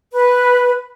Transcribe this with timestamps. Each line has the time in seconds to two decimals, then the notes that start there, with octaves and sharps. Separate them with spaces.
0.12 B4